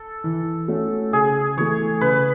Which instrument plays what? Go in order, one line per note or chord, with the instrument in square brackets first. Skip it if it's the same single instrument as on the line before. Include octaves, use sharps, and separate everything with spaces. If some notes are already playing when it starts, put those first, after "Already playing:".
Already playing: [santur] A4
[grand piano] E3
A3 C#4 F#4
[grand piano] C#3 [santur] G#4
[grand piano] E3 A3 [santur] C#5
[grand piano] C#3 [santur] B4